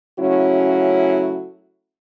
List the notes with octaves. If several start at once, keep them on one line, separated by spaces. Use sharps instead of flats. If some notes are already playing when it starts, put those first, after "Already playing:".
C#3 F#3 A3 C#4 E4 F#4